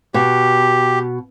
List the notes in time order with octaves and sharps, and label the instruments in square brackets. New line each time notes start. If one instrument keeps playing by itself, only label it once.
[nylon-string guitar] B2 [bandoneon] G4